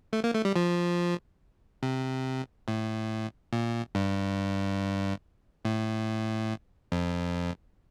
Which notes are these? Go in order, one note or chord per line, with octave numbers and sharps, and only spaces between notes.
A3
A#3
A3
G3
F3
C3
A2
A#2
G2
A2
F2